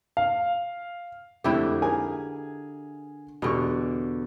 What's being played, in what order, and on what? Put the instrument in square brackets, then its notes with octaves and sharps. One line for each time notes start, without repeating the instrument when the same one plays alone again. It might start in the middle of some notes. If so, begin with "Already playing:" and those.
[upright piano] F5
[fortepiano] F2 A3 [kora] D3 E4 G4
[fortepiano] G#4 A#4 G#5
[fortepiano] E2 G4 C#6 [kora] B2 D3